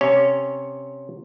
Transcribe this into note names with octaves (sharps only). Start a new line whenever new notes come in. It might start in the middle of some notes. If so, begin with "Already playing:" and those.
C3 C#4 C#5